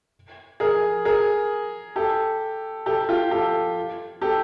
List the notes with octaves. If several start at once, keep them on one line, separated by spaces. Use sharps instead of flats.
G#4 A#4
G#4 A#4
G4 A4
G4 A4
F4 G4
G4 A4
G4 A4